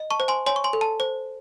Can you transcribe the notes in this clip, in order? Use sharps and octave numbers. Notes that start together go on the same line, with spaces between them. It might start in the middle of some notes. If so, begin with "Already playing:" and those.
Already playing: D#5
A5 C#6
C5
G#5 C6
C#5 G#5 C6
C#6
G#5 C6
A4
A5
C5